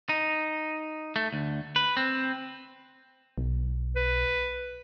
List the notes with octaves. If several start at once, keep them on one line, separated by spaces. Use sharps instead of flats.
D#4
A3
D2
B4
C4
B1
B4